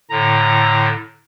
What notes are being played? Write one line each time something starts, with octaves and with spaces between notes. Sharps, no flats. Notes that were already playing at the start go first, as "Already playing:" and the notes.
A2 D3 A#5